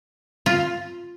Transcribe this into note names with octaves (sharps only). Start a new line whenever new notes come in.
F4